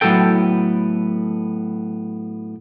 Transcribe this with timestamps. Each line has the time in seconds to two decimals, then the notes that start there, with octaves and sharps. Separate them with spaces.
0.01 A2 F#3 A3 B3 A4 G5